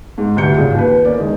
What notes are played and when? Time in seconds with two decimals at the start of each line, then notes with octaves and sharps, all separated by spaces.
0.18 G#2
0.37 D2 G2 C3 G6 C#7
0.54 G#1 C#3 F4
0.74 D#2 B4
1.05 A#3 C#4 D5
1.18 E2 D#3 G#3